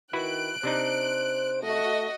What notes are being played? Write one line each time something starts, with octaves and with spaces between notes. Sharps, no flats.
D#3 E4 F#4 B4 F#6 D7
C3 D4 D#4 C5
A3 F#4 D#5